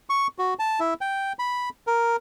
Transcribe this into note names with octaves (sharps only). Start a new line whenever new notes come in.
C#6
F#4
A5
E4
G5
B5
A#4